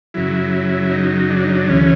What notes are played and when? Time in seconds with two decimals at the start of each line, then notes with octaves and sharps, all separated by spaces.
0.14 F#2 C#3 F#3 E4
0.91 D#4
1.30 D4
1.43 D#4
1.55 D4
1.68 D2 C#3 E3 C#4